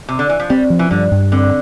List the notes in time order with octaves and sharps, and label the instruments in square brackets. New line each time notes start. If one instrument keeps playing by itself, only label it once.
[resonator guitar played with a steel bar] C3
D3
E3
F3
[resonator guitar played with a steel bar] G3 [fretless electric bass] C4
[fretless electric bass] F3
[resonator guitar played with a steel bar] E3
[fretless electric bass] G2 [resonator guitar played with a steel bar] D3
[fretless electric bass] G2
[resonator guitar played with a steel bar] D3 [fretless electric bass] C4